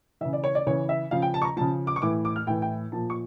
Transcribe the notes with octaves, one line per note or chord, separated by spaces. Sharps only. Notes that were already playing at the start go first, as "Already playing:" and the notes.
C#3 E3 E5
D5
C#5
D5
C#3 E3 C#5
E5
C#3 F3 F5
G5
A5
C#6
A#5
C#3 F3 A5
D6
C#6
A2 E3 D6
D6
F6
A2 E3 G5
G5
A#2 F3 A5
C#6